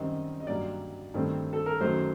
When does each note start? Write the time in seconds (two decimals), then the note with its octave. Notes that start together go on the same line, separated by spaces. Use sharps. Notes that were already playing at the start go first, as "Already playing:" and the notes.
Already playing: F#2 D#3 G3 C4 D#5
0.40 D#5
0.47 G2 F#3 A#3 D5
1.14 G2 D#3 A3 C4
1.53 A4
1.66 A#4
1.80 F#2 D#3 F#3 A3 C5